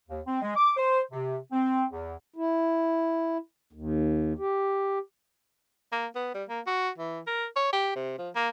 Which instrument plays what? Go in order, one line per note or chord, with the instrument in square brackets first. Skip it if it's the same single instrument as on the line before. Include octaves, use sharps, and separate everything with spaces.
[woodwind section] D#2
C4
G#3
D6
C5
C3
C4
E2
[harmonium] E4
D#2
G4
[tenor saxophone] A#3
B3
G3
A#3
F#4
E3
A#4
C#5
G4
C3
F3
A#3